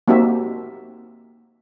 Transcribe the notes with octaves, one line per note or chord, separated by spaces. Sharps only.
A#3 C4 D#4 F#4 G4 E5